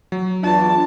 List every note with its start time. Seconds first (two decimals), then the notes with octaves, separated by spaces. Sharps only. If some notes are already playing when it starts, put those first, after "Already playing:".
0.12 F#3
0.43 E2 D4 F4 A5